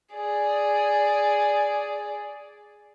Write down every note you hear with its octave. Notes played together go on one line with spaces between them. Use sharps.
G#4 D5